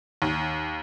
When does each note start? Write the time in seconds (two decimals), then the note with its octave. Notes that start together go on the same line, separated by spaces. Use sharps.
0.22 D#2